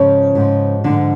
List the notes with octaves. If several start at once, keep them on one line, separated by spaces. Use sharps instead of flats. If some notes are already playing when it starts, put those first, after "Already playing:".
Already playing: G#2 C#3 F3 C#4
G#2 F3
G#2 D3 F3 D4